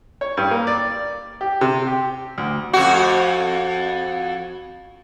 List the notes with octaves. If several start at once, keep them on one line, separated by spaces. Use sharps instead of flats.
C#5
G2
A#3
D5
G4
C3
G4
D2
F2 F#4